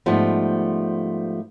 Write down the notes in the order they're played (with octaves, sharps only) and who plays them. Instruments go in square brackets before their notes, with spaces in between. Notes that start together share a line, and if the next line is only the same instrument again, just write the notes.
[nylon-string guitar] G#2 F3 G3 A3 B3